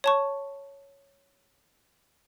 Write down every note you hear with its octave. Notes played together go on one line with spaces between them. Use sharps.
C#5 A5 C#6